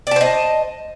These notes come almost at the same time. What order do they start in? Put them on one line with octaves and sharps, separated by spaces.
D5 A5 C5 D#5